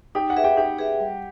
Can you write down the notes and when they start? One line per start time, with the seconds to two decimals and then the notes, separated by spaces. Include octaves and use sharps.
0.15 D#4 G4 G5
0.30 F#5
0.37 G#4 B4 E5
0.44 G4 G5
0.57 D#4 G4 G5
0.79 G#4 B4 E5
1.00 G3